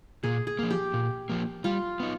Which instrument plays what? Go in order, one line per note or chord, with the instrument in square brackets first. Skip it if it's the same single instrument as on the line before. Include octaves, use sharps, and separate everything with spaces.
[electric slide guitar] A#2 [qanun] G#4
[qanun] G#4
[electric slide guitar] F3 A#3
[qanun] G4
[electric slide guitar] A#2
F3 A#3
[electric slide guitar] G3 [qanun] F4
[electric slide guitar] B3 D#4